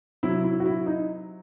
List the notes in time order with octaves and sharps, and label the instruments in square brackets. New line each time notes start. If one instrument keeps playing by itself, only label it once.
[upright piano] C3 F#3 E4
E4
F#4
E4
D#4